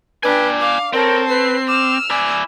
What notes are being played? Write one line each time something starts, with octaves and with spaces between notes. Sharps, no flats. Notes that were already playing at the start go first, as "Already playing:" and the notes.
D4 B4 D5 G5 G#5
F5 D6
C4 A4 A#4 C#5
B4 C7
D6 E6 F6
E4 D5 G#5